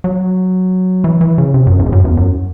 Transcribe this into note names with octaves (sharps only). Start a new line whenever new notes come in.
F#3
E3
E3
C#3
C3
F#2
E2
G#2
F#2
E2
F#2